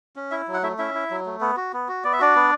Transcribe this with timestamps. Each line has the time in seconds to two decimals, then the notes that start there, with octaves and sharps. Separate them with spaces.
0.16 C#4
0.31 E4 E5
0.48 F#3
0.54 F#5
0.63 A3 E4 E5
0.78 C#4 E4 E5
0.95 E4
1.11 F#3
1.26 A3
1.41 B3
1.57 F#4
1.73 B3
1.88 F#4
2.04 B3 D5
2.13 E5
2.19 D4 F#4 D5
2.35 B3